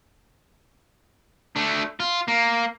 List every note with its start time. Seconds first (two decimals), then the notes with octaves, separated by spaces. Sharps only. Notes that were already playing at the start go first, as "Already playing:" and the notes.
1.56 A3 D4
2.00 F4
2.28 A#3